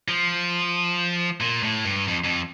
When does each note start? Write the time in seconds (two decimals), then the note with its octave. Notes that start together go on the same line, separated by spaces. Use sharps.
0.08 F3
1.41 A#2
1.63 A2
1.85 G2
2.08 F2
2.24 F2